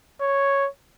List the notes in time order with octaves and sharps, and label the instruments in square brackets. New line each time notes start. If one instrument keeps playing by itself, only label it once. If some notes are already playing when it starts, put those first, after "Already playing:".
[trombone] C#5